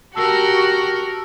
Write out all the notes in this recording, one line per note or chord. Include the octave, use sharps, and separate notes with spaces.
F#4 G4 A#4 A5 E6